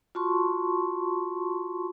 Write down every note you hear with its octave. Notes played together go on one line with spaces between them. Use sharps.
F4 F#4 A5 C6 C#6